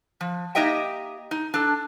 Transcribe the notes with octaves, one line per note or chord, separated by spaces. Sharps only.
F3
A#3 D#4 G4 D#5 E5 G5
D#4
D4 A4